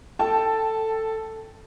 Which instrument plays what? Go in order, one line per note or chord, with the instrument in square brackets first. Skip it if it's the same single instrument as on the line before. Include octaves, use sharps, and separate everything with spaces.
[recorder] A4 [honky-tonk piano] G5 A5